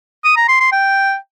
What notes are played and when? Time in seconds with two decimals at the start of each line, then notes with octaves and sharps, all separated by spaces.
0.25 D#6
0.37 A#5
0.49 C6
0.61 C6
0.72 G5